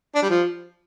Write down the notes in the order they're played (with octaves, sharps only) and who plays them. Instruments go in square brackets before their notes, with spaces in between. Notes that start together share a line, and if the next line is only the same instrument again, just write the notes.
[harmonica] D4
G3
F3